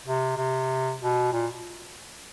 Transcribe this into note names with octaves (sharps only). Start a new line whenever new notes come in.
C3
C3
B2
A#2